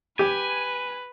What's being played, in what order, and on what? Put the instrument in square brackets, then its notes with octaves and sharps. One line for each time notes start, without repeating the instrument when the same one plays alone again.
[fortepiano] G4 [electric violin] B4 [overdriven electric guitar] G#5